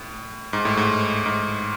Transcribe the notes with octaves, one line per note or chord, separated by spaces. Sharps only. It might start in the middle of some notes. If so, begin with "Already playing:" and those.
Already playing: A2
G#2
A2
G#2
G#2